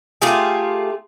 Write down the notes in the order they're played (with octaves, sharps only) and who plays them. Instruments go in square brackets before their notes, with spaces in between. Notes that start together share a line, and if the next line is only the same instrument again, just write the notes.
[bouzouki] A3 F4 G4 G#4